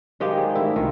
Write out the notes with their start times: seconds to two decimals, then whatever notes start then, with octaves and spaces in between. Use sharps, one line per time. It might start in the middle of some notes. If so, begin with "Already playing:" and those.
0.20 D#3 G#3 F#4 G4 C5 F5
0.38 G#4 D5
0.55 D#3 A3 D4 E4
0.76 C2 D#3 F4 F5 C6